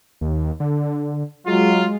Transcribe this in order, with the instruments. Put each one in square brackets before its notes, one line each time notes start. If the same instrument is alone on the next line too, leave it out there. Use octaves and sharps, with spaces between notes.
[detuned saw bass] D#2
D3
[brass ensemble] F#3 F4 [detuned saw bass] G#3